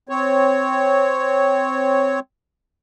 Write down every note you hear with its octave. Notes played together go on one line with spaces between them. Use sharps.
C4 C#5